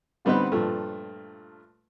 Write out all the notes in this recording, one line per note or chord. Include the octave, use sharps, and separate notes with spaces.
D3 G3 B3 C4 D#4 B4
G2 A#2 F3 A3